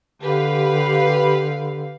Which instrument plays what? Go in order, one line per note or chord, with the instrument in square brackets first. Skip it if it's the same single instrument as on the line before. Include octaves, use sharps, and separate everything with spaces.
[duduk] D3 [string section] G4 B4 F5